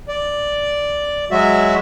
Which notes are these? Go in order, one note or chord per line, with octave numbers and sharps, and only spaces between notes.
D5
F#3 G#3 F#4 E5